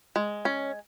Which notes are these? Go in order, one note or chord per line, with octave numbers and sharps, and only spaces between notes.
G#3
C#4